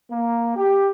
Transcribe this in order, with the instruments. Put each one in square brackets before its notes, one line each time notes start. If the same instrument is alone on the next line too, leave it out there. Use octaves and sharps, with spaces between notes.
[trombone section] A#3
G4